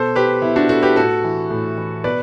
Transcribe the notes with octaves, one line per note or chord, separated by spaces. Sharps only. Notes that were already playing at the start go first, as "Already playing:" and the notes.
Already playing: B2 A4 C5
G4 B4
B2 E4
D4 F#4
F#4 A4
G4 B4
A2 F#4 A4
E3
A2
E3
B2 B4 D5